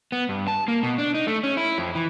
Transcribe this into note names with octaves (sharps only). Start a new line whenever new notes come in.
B3
G2
A5
A#3
B2
D4
D#4
A3
C#4
E4
F2
E3